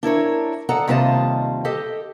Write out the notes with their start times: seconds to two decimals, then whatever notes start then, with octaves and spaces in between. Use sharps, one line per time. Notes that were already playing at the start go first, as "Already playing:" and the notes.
0.03 D4 E4 A#4 C#5
0.69 A4 D5 D#5 F#5 A#5
0.88 D#2 C3 G3 F4 D#5 A5
1.65 G4 A4 D#5